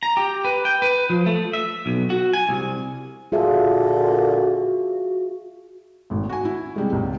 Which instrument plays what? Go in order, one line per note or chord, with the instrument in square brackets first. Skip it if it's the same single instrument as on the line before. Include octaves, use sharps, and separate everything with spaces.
[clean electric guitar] A#5
G4
B4
G5
B4
F3
A3
E5
B1
F#4
G#5
C2
[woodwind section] A#2 D3 [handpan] F4 G#4 E5 [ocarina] F#4
[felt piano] G#1 A2
F#4 G#5
E4
C3 G3 G#3
C#2 G#2